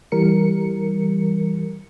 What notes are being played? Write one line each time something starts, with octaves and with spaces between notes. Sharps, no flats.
E3 G3 A#4 C#7